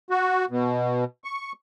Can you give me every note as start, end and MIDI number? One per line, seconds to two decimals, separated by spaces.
0.10 0.45 66
0.50 1.04 47
1.24 1.52 85